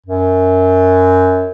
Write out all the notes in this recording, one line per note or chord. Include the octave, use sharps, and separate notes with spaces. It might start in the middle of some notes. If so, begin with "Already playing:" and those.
F#2